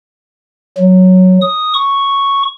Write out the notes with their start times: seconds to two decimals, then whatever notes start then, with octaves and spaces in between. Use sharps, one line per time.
0.77 F#3
1.42 D#6
1.74 C#6